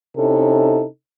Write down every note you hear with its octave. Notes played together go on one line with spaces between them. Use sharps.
C3 C#4 D#4 E4 A4